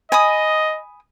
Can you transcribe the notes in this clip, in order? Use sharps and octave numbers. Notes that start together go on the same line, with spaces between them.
D#5 G#5 B5 D#6